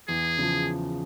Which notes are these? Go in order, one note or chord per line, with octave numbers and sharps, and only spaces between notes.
E2 G#4
C#3 F3